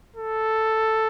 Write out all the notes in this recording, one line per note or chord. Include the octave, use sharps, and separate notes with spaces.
A4